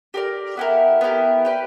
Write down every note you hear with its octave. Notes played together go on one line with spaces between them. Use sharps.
G4 A#4 D5
B3 E4 G4 A#4
B3 E4 G4 A#4
G4 B4 D5